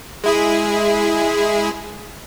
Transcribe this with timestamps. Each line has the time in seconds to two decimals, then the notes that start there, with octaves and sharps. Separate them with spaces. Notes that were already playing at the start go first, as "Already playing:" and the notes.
0.24 G#3 E4 G#4